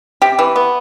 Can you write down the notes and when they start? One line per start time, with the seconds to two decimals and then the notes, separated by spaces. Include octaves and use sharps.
0.22 C3 G4
0.39 E3
0.56 B3